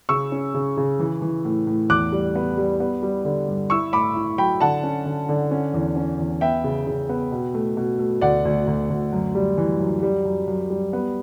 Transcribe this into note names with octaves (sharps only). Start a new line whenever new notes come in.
C#3 C#6 E6
C#4
C#3
C#3
E3
E3
A2
A2
E2 D6 F#6
G3
B3
G3
B3
G3
D3
G2
E4 C#6 E6
A2 B5 D6
E4
F#3 G5 B5
D3 F#5 A5
C#4
D3
D3
C#4
E2
C#4
E2
B3 E5 G5
C#3
C#3
B3
B2
A3
B2
A3
D2 D5 F#5
D2
D2
D2
F#2
G3
E3
F#2
G3
F#2
F#2
G3
B3